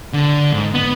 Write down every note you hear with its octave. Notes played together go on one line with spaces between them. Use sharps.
D3
G#2
B3